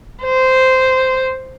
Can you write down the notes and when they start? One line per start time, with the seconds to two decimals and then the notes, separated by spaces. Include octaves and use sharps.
0.24 C5